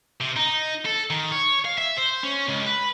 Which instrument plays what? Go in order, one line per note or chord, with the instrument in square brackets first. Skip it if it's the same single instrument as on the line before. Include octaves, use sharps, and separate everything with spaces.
[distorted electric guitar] C3
D#4
A4
D#3
C#5
F5
E5
C5
C#4
C#2
B4